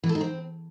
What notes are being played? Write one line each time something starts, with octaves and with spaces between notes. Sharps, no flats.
E3
A4
D#4
C4